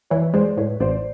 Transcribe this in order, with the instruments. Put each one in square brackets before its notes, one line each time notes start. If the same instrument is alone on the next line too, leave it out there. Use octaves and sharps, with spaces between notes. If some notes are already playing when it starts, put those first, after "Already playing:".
[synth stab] E3 [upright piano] B4 C#5
[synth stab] G#3 [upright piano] C5 D5
[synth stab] A2 [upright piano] B4 C#5
[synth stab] A1 [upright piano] C5 D5